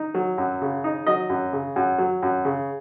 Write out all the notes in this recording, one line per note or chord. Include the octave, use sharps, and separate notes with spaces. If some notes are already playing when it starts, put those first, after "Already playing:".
Already playing: D#4
F#3
F#2
C#3
D#4
F#3 D#5
F#2
C#3
F#2
F#3
F#2
C#3